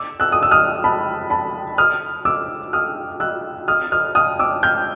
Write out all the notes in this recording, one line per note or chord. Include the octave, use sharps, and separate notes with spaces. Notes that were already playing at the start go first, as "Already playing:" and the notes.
Already playing: D6 E6
E6 F#6
D#6
E6
D#6 F6
A5 B5
A5 B5
D#6 F6
D6 E6
D#6 F6
E6 F#6
D#6 F6
D#6 F6
D#6 F6
D6 E6
F6 G6